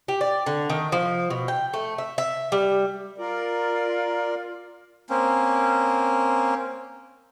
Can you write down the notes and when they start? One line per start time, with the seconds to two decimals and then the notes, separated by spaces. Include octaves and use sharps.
0.08 G4
0.21 D5
0.46 D3
0.70 D#3
0.92 F3
1.30 B2
1.48 G5
1.74 A3
1.98 E5
2.18 E5
2.52 G3
3.18 F4 A#4 D5
5.10 A#3 C4 C#4